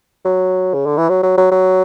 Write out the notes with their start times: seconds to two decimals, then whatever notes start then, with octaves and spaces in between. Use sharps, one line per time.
0.25 F#3
0.74 C#3
0.86 D3
0.97 E3
1.09 F#3
1.23 F#3
1.37 F#3
1.51 F#3